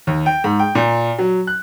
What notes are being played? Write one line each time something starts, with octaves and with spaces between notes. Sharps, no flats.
D#2
G5
G#2
G5
A#2
F#3
F#6